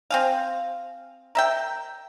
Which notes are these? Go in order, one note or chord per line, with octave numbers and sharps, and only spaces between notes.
C4 G#4 F5
A#4 E5 G5